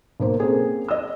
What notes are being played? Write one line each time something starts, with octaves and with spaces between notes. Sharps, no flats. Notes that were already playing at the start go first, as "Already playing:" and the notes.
B1 A#3 C5
A#3 C4 C#4 G#4 A4
D#5 E5 E6